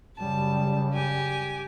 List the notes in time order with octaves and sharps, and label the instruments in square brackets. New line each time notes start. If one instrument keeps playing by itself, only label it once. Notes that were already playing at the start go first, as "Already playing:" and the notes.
[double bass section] F#2 C#3 G3 [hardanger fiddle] A5
[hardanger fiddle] G4 G#5